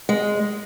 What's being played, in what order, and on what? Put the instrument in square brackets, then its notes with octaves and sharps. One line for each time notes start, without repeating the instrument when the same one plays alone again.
[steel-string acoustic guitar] G#3